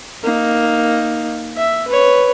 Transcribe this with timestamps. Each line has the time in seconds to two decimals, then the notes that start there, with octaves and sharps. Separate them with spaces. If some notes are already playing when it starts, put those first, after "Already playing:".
0.23 A#3 D#4
1.56 E5
1.88 B4 C#5